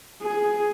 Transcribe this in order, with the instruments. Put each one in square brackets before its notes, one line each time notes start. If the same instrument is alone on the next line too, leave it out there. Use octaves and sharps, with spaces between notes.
[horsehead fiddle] G#4